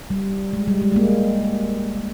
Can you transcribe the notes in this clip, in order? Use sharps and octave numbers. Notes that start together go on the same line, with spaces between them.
G3
G#3
G3
G#3
G#3
A#3